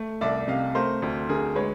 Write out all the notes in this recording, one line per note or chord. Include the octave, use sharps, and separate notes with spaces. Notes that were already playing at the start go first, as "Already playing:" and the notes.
Already playing: A3
C2 D5 E5
C3 D#5 F5
A3 A#4 C5
D2
D3 G#4 A#4
G#3 B4 C#5